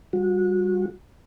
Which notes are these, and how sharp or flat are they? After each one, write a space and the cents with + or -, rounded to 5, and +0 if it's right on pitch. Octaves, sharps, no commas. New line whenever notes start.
G3 +0 F#4 -30